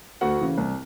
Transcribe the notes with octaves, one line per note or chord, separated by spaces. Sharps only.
D2 F#4 F#5
C#3 E3
C2